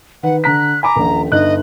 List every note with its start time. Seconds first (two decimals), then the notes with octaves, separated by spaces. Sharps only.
0.23 D#3 B4 F#5
0.44 D3 A#5 F#6 B6
0.83 G#5 A#5 B5 D6
0.95 D#1 A#1
1.32 G1 D#4 D#5 F#6